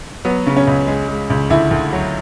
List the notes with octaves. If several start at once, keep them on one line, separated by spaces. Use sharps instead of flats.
F#3 B3
C#3
C#4
C#2
G#3
G#3
C#2
D2 E4
D2
F#3